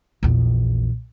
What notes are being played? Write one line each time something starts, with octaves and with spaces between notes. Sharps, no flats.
A#1 E2